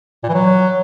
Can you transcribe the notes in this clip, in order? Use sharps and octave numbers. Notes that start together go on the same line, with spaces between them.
A#2
E3
F#3